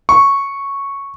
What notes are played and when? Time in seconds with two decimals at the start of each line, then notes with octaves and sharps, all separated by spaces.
0.09 C#6